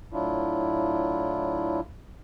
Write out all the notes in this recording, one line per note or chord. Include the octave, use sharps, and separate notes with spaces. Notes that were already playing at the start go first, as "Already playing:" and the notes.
A2 F#3 D4 E4 F4